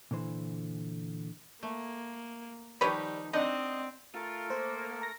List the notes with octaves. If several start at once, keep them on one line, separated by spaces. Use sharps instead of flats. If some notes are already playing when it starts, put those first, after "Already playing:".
A#2 D3 E3 C5
A3 A#3
D#3 F3 G3 D#4 G4 B4 C#5
C4 D4 D#4 D#5 F#5
A3 F4 A4 A#4
A#3 C5
A#5 A#6